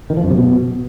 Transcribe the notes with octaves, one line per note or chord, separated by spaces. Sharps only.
D#3
F3
F#2
C3
B2